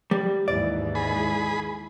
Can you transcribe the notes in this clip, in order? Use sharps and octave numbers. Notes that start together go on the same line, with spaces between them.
G3
D#2 G#2 E3 D5
G#4 B5